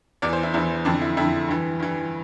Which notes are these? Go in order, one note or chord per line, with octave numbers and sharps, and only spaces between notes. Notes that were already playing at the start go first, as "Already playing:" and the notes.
E2 E3 D5
C5
E4
E2 E3 E4
F2 D3 D4
E4
F2 D3 E4
G2 E3
G2 E3